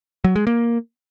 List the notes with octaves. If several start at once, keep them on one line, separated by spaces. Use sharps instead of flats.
F#3
G#3
A#3